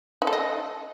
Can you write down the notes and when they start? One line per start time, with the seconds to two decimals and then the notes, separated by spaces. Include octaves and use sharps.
0.22 D#4
0.27 A4
0.33 D#5